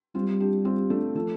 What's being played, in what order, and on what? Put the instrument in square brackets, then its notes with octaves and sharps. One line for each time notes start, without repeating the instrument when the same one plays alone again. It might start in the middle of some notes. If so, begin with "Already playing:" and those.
[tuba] G3 [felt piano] C4 F4
[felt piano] D4 G4
C4 F4
A3 D4
F3 A3